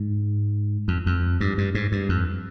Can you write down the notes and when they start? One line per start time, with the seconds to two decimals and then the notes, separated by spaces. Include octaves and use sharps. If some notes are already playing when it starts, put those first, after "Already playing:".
Already playing: G#2
0.88 F2
1.06 F2
1.40 G2
1.58 G2
1.75 G#2
1.92 G2
2.09 F2